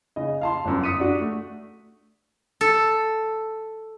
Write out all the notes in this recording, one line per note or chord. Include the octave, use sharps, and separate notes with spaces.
C#3 D#5
F5 A5 C6
G1 F#2
D#6 B6 C#7 D#7
D4 F#4
A3
A4